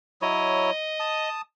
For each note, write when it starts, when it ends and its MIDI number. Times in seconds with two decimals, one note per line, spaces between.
0.22 0.71 54
0.22 0.71 64
0.22 0.71 73
0.22 1.29 75
1.00 1.41 81
1.00 1.41 87